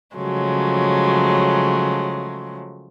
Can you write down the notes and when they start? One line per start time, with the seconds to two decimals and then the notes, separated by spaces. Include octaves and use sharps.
0.16 C#3 F3 F#3 G#3 A3